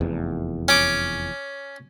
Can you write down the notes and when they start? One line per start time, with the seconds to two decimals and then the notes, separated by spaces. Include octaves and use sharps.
0.01 F1 E2
0.68 C#4 D6